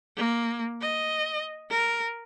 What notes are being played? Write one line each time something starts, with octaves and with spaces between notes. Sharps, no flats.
A#3
D#5
A#4